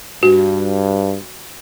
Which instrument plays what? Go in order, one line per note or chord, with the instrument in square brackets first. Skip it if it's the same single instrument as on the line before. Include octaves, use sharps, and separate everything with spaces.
[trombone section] G2 [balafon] F#4